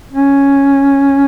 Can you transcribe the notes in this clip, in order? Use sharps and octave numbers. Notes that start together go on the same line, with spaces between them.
C#4